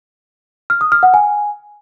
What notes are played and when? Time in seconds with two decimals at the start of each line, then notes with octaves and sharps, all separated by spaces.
0.70 F6
0.81 D#6
0.92 F6
1.03 F#5
1.14 G#5